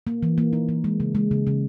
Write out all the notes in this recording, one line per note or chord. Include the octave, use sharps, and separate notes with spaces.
A#3
E3
A#3
D#4
E3
G#3
C#3
G#3
C#3
C#3